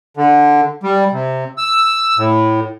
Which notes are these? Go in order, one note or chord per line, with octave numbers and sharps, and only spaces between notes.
D3
G3
C3
E6
A2